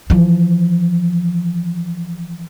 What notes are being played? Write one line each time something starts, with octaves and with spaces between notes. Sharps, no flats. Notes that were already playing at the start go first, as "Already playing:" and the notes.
E3 F3